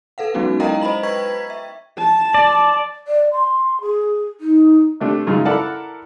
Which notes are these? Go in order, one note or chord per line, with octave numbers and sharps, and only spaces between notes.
A4 B4 F5 F#5
F#3 G#3 B3 C#4 D#4 F#4
E4 A#4 D#5 F5 G5 A#5
C5 D#5 A#5 B5 F#7
B4 G5 C#6 G#6 B6
E5
A5
D5
D5
C6
G#4
D#4
C3 A3 D4 G4
F#2 C#3 G#3 D#4 F4
E4 A4 A#4 D5 F#5 A5